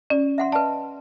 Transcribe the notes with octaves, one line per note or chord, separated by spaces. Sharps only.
C#4 D5
E5 F#5 C6
B4 D5 D#5 A5